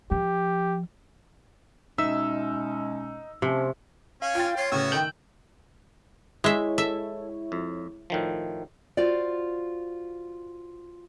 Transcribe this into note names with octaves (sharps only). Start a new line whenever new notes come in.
F3 G4
B2 G#3 C#4 D#4 E5 E6
C3 F3 A3 C#4
C#4 F5
F4 G5 A6
F4 C#5
A2 C#3 B3 F#4 E6
D#3 G5 G6 F#7
G#3 E4 C#5 E5
A4 E5
F2
A2 D#3 F3
F4 F#4 C5 D5